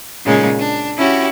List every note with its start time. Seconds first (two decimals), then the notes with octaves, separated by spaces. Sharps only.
0.24 A#2 C#3 G#3 C#4 D#4
0.57 D4
0.96 C#4 E4 F#4 G4